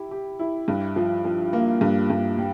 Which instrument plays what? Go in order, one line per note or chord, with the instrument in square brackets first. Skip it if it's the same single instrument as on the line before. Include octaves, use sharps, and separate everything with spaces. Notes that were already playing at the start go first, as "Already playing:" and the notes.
Already playing: [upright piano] E4 G4
G4
E4
G2
F3
F3
A#3
G2
G2
G3